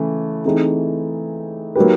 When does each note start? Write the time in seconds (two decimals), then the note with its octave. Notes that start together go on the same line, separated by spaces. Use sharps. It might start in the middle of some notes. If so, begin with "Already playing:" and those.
Already playing: C#3 E3 A3
0.45 E3 A3 C4 D#4 G#4
1.75 F#3 A#3 D#4 G4 B4